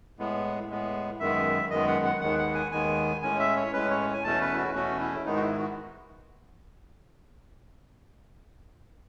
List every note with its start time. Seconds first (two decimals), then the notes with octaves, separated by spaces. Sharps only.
0.19 A2 G#3 B3
0.69 A2 G#3 B3
1.20 F#2 D#3 G#3 B3 E5
1.70 F#2 D#3 G#3 B3 D#5
1.87 F#5
2.05 F#5
2.21 D#2 D#3 G#3 B3 F#5
2.38 F#5
2.54 G#5
2.72 D#2 D#3 G#3 B3 G#5
3.22 A2 G#3 C#4 G#5
3.39 E5
3.56 C#5
3.73 A2 G#3 C#4 B4
3.90 C#5
4.13 G#5
4.24 E2 B2 A3 C#4 A5
4.41 B4
4.53 E4
4.57 F#4
4.74 E2 B2 A3 C#4 F#4
5.00 E4
5.25 G#2 D#3 G#3 B3 D#4
5.36 F#4
5.41 E4
5.59 F#4